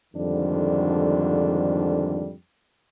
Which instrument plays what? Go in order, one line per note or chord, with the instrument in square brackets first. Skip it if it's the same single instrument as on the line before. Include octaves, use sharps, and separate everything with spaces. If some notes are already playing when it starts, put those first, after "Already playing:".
[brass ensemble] F2 G#2 D3 D#3 G3 D4